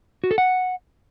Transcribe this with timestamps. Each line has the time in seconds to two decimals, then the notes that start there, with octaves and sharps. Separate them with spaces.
0.24 F#4
0.31 A4
0.38 F#5